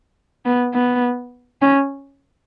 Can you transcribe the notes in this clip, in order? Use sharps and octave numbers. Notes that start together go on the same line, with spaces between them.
B3
B3
C#4